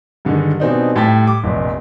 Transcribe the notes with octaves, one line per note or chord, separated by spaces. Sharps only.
G2 D3 D#3 G#3
B2 E3 G3 C4 D4 D#4
A2 G3 G5 A5 A6 B6
D6
F1 A#1